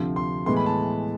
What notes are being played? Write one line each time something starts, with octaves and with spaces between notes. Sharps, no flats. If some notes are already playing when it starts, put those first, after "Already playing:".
Already playing: D2 C3 F3
C6
A2 E3 G#3 B3 C6
B5
A5